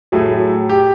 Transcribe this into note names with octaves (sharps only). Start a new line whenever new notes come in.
A2 F#3 A3 G#4
G4